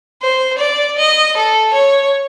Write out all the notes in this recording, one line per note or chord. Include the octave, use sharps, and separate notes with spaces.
C5
D5
D#5
A4
C#5